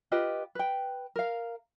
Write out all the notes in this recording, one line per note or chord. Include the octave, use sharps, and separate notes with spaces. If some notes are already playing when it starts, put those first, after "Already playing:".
F4 G4 B4 D#5
B4 G5
A#4 F5